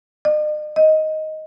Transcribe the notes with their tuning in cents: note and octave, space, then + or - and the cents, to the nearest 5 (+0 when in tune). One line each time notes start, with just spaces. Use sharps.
D#5 -45
D#5 +5